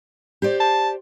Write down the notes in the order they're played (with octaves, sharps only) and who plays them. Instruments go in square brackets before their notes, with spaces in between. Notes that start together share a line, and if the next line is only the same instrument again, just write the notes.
[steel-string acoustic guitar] G4 C5 D5
[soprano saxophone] A5